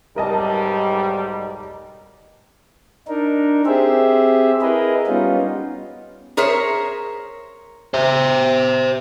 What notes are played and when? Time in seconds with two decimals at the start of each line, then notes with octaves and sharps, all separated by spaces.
0.16 B1 G#2 G3 A#4 D#5 A5
3.08 D4 D#4 A#4
3.66 C4 G4 G#4 C5 E5
4.61 E4 G#4 A#4 B4 D#5
5.07 G3 B3 C#4 D#4 F4
6.37 G#4 A#4 C5 C#5 E5
7.94 C5 E5